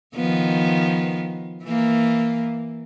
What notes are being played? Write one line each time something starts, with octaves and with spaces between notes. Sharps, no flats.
D#3 F3 B3
E3 A#3